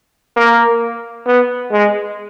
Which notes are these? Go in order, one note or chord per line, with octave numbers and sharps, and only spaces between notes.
A#3
B3
G#3